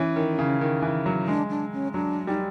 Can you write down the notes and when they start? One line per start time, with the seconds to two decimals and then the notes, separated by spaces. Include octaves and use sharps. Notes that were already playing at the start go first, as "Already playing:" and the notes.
Already playing: E3 C#4
0.16 D#3
0.38 C#3
0.61 D#3
0.82 E3
1.06 F#3
1.27 G#3 D4
1.50 D4
1.73 C#4
1.94 F#3 D4
2.27 G3 D#4